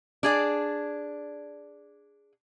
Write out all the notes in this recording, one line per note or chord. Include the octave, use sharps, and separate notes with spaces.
D4 G#4 D5